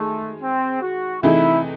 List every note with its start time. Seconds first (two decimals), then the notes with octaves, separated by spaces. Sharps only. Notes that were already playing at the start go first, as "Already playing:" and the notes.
Already playing: D#3 G#3 A3 G#4
0.42 C4
0.81 F#4
1.23 C3 E3 A3 D#4 E4 G#4